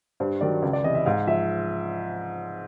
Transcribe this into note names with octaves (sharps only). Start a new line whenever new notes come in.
G2 C5
D#3 F#3 D5
C#2 D5
D5
C3 E3 D#5
E5
G#2 F5
F3 E5